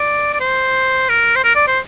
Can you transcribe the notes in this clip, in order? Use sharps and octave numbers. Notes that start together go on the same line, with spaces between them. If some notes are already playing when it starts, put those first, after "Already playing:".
Already playing: D5
D5
C5
A#4
C5
A#4
D5
C5